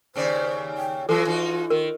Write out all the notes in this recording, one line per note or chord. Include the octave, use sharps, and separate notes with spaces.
D#2 C#3 C5 D5
G5
E3 F#3 F4 A4
E3 D#4 F#4
D#3 A#4